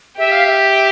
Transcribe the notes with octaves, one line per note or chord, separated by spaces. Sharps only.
G4 E5
F5
E5